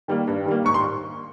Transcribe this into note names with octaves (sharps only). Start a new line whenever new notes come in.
D#3 G3 A#3
G2
D#3 G3 A#3
G#2 C#6
C6